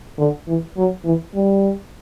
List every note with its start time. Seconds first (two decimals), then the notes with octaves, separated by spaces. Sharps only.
0.19 D3
0.48 E3
0.77 F#3
1.05 E3
1.35 G3